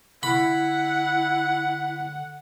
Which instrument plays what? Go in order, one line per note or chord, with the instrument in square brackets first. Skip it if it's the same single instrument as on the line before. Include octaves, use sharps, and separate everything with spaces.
[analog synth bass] D3 [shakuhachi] E4 [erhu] F#5 [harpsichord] B5